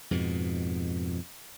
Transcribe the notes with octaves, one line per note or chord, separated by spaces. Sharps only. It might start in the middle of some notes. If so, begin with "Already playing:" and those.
F2 G#2 B2